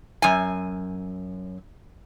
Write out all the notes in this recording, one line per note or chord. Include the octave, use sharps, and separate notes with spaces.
F#2 G#5